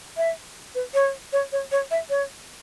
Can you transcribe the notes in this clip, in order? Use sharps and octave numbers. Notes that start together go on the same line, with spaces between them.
E5
B4
C#5
C#5
C#5
C#5
E5
C#5